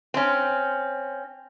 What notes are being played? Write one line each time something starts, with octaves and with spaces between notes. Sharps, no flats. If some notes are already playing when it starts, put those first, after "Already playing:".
C4 C#4